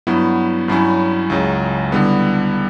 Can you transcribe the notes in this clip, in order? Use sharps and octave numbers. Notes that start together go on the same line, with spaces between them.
G2 F#3 B3 E4
G2 F#3 C#4 E4
C#2 C#3 F#3
D3 G3 B3 E4